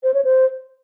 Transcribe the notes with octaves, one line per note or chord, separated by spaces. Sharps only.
C5
C#5
C5